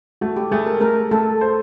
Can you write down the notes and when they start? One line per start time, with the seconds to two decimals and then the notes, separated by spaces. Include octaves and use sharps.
0.21 A3 F#4
0.36 G4
0.51 A3 G#4
0.66 A#4
0.81 A3 A#4
1.11 A3 A4
1.41 C5